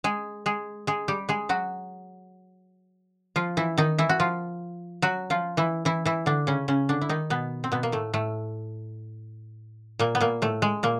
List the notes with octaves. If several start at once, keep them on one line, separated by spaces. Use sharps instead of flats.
G#3 G#4
G#3 G#4
G#3 G#4
G3 G4
G#3 G#4
F#3 F#4
F3 F4
E3 E4
D#3 D#4
E3 E4
F#4
F3 F4
F#3 F#4
F3 F4
E3 E4
E3 E4
E3 E4
D3 D4
C#3 C#4
C#3 C#4
D3 D4
E4
D#3 D#4
B2 B3
C4
B2 B3
A#3
A2 A3
A2 A3
A#2 A#3
B3
A#2 A#3
A2 A3
G#3
A#2 A#3